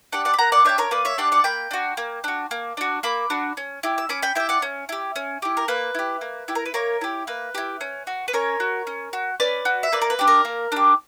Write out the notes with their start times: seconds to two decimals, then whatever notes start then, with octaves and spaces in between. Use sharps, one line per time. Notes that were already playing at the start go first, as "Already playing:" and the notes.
0.12 D4 G4 D5 F#5
0.25 D5 F#5
0.34 B5
0.39 A#3 F#5 A#5
0.52 D5 F#5
0.65 D4 G4 C#5 E5
0.78 A#4 C#5
0.91 A#3 B4 D5
1.05 C#5 E5
1.18 D4 G4 D5 F#5
1.32 D5 F#5
1.44 A#3 G5 B5
1.71 D4 F#4
1.97 A#3
2.24 D4 F#4
2.51 A#3
2.77 D4 F#4
3.03 A#3 B5 D6
3.30 D4 F#4
3.57 C#4
3.83 E4 G4
3.98 E6
4.09 C#4 B5 D6
4.22 G5 B5
4.35 E4 G4 E5 G5
4.49 D5 F#5
4.62 C#4
4.89 E4 G4
5.16 C#4
5.42 E4 G4
5.57 A#4
5.68 A#3 B4
5.95 E4 G4
6.21 A#3
6.48 E4 G4
6.55 A#4
6.66 B4
6.74 A#3 A#4 C#5
7.01 E4 G4
7.27 A#3 B4
7.55 E4 G4
7.81 C#4
8.07 F#4
8.28 B4
8.33 C#4 A#4 C#5
8.60 F#4
8.87 C#4
9.13 F#4
9.40 C#4 B4 D5
9.65 F#4
9.83 E5
9.92 A#3 B4 D5
10.02 A#4
10.10 B4
10.19 D4 G4
10.27 A#4
10.45 A#3
10.72 D4 G4